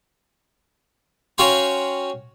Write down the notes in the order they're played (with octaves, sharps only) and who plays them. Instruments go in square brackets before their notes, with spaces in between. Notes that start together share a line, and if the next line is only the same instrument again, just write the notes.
[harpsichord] C#4 F#4 F5 G5 C6